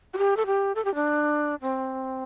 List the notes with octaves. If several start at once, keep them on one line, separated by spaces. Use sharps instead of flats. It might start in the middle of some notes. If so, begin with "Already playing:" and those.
F#4
G4
A4
G4
A4
G4
D4
C4